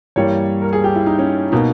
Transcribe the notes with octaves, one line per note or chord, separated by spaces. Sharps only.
G2 E3 G3 A#3 C#5
A#4
G#4
G4
E4
D#4
C#4
B2 A#3 D#4